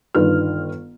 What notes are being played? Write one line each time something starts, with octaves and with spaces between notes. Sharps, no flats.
G1 D#3 D4 F4 B4 F6